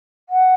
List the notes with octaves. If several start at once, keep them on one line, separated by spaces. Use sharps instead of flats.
F#5